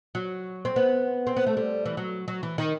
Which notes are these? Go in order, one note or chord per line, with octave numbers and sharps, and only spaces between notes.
F#3
C4
B3
C4
B3
A3
G3
E3
F#3
F#3
E3
D#3